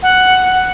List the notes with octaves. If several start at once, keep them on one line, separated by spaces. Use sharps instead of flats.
F#5